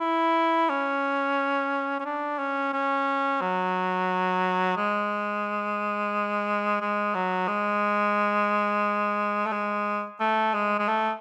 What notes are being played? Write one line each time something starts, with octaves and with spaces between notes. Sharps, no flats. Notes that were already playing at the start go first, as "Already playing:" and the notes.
E4
C#4
C#4
D4
C#4
C#4
F#3
G#3
G#3
F#3
G#3
A3
G#3
A3
G#3
G#3
A3